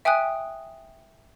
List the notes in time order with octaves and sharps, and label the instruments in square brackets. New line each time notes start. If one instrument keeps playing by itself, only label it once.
[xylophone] E5 G5 G#5 D#6 F#6